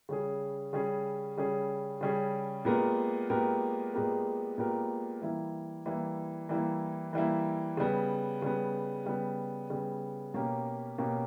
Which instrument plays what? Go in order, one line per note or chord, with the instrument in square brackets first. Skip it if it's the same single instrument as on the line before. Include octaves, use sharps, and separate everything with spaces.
[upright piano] C#3 G3 C#4 G#4
C#3 G3 C#4 G#4
C#3 G3 C#4 G#4
C#3 G3 C#4 G#4
A#2 G#3 B3 G4 A#4
A#2 G#3 B3 G4 A#4
A#2 G#3 B3 G4 A#4
A#2 G#3 B3 G4 A#4
E3 G3 A#3 E4
E3 G3 A#3 E4
E3 G3 A#3 E4
E3 G3 A#3 E4
C#3 G3 B3
C#3 G3 B3
C#3 G3 B3
C#3 G3 B3
B2 A#3 C#4 G4 A#4
B2 A#3 C#4 G4 A#4